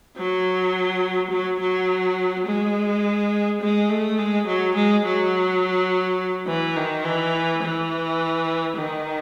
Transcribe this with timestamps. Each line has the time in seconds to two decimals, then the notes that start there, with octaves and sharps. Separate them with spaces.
0.17 F#3
1.31 F#3
1.60 F#3
2.47 G#3
3.61 G#3
3.89 A3
4.19 G#3
4.47 F#3
4.75 G#3
5.05 F#3
6.47 E3
6.76 D#3
7.04 E3
7.63 E3
8.77 D#3